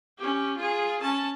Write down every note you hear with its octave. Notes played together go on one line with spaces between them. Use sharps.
C#4 G4
F4 G#4
C#4 A5